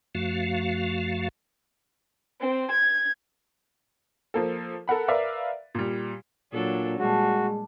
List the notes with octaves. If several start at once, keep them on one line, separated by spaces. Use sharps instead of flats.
F#2 F3 A3 F#4 F5
C4
G#6
F3 A#3 A4
A4 A#4 F#5 B5
A#4 B4 D5 E5 F5
A#2 G3
A#2 F#3 D4 A4
A#2 G3 G#3 D4 F#4